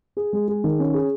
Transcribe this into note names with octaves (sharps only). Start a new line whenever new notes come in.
G#4
G#3
G#4
D#3
C#4
G#4